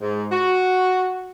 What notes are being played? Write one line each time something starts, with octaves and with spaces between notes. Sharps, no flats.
G#2
F#4